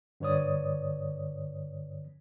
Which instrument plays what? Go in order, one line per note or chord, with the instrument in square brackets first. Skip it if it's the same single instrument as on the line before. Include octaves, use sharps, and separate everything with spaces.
[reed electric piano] G2 D3 B4 C#5 D5 D#6